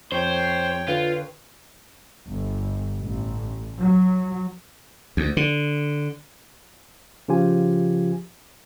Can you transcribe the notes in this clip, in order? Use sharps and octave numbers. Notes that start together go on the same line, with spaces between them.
F2 C5 C#5 G5
D3 F4 B4
G1
A1
F#3
D2
D3
C#3 F3 F4 G4 G#5